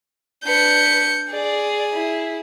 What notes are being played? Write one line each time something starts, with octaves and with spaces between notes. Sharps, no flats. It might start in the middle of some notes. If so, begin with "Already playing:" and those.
D4 B4 G6 C#7
G#4 D5
E4